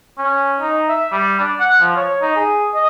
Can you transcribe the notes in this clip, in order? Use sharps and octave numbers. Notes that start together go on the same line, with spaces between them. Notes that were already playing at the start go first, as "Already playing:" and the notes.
C#4
D#4
E5
G3
D4
F#5
F3
C#5
D#4
G#4
D#5